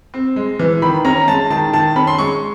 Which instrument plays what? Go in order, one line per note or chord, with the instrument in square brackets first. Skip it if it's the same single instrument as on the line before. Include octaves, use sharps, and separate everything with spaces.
[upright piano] C4
G#3
E3
D#3 B5
C#4 A#5
G#3 A5
D#3 A5
D#3 A5
C#4 B5
C6
G#3 C#6